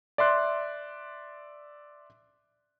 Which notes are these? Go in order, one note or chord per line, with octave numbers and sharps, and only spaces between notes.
D5 E5 C6 F#6